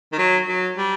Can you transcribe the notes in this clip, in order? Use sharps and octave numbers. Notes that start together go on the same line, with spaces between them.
D#3
F#3
F#3
G3